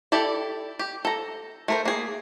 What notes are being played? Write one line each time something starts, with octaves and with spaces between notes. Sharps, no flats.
E4 G4 A4 D5
G4
A4 A#5
A3 A#4 C5
A#3 G#4